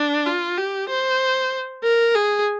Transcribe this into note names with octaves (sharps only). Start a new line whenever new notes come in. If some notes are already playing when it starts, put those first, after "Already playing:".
Already playing: D4
F4
G4
C5
A#4
G#4